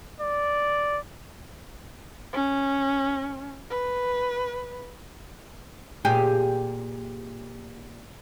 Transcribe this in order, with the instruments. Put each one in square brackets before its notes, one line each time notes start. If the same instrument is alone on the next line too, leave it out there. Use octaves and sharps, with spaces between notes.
[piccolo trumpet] D5
[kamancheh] C#4
B4
[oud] A#2 G4 G#4